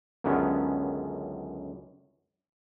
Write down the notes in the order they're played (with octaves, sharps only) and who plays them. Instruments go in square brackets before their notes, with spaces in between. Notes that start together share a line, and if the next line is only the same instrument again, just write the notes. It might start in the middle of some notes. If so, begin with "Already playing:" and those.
[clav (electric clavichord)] C#2 F#2 D3 D#3 B3 C#4